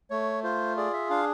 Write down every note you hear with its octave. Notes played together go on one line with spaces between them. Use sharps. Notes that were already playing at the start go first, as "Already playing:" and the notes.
A3 C#5
F4 C5
G#4 D5
E5
D4 F5